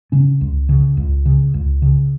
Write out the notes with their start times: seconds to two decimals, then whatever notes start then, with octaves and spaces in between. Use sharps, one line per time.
0.12 C#3 C#4
0.41 C#2
0.69 C#3
0.97 C#2
1.26 C#3
1.54 C#2
1.82 C#3